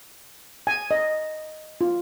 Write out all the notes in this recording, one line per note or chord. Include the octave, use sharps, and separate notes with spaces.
G#5
D#5
F4